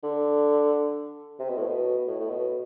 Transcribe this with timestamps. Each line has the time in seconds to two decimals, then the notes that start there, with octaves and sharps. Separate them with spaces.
0.03 D3
1.39 C3
1.48 B2
1.58 A2
1.66 B2
2.07 A2
2.20 A2
2.29 B2